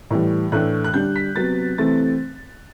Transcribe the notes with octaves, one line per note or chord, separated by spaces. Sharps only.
A2 E3 G3
A2 E3 A3 D4 F#6
F#6
D3 G3 D4 G6
B6
C3 F#3 B3 A6
C3 E3 A3 C4 A6